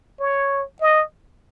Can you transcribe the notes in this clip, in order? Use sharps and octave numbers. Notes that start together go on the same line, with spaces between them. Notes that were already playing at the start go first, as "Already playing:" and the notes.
C#5
D#5